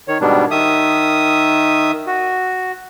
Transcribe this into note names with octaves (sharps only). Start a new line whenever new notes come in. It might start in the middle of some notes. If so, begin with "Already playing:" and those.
D#3 C#5
G#2 B2 D#3 G3 B3 D4
D#3 E5 D#6
F#4